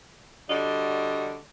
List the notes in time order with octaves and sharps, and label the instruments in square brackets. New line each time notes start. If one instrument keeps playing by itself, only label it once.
[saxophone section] D3 G3 F#4 D#5